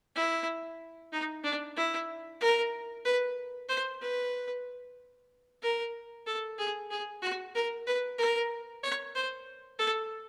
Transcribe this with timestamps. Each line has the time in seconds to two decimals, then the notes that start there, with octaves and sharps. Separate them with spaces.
0.16 E4
1.12 D#4
1.44 D4
1.77 E4
2.41 A#4
3.05 B4
3.69 C5
4.01 B4
5.62 A#4
6.27 A4
6.58 G#4
6.91 G#4
7.22 F#4
7.55 A#4
7.87 B4
8.18 A#4
8.83 C#5
9.15 C5
9.79 A4